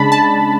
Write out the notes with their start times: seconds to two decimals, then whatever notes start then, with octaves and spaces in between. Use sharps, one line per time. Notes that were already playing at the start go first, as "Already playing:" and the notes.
Already playing: C#3 G#3 D4 A5 B5
0.12 A5